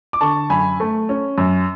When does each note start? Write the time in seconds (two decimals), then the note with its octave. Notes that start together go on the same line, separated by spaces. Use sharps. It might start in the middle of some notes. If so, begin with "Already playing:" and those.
0.13 D6
0.21 D3 A5 C#6
0.50 F#2 G#5 B5
0.80 A3
1.09 C#4
1.38 F#2